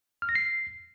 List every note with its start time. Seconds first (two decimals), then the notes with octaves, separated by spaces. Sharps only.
0.22 F6
0.29 A#6
0.35 C7